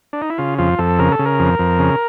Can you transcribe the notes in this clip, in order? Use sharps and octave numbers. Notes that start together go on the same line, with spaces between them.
D4
D#4
E4
C#3 F4
F2 F4
F2 A4
C#3 A#4
A4
C#3
A#4
F2
F2
C#3